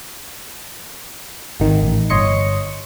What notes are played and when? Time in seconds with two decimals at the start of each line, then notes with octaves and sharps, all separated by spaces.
1.60 G#1 D#3
1.83 A1
2.10 G1 C#5 D#5 C6 C#7